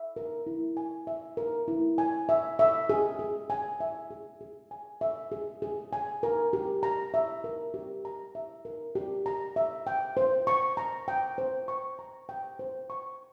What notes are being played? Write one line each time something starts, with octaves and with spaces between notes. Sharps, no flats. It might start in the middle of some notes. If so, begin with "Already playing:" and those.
Already playing: E5
A#4
E4
G#5
E5
A#4
E4
G#5
E5
E5
G#4
G#4
G#5
E5
G#4
G#4
G#5
E5
G#4
G#4
G#5
A#4
G4
A#5
E5
A#4
G4
A#5
E5
A#4
G4
A#5
E5
G5
C5
C#6
A#5
G5
C5
C#6
A#5
G5
C5
C#6